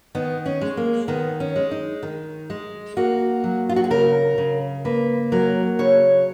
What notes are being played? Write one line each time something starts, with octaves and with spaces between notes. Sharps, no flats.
D#3 B3
C#4
G#3
A#3
D#3 B3
C#4
G#3
D#4
D#3
G#3
A#3 F#4
F#3
F4
F#4
G#4
C#3 A#4
C#3
A#3 B4
F#3 A#4
C#3 C#5